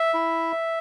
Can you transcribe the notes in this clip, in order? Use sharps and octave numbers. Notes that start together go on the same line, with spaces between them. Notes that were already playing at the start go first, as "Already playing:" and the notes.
Already playing: E5
E4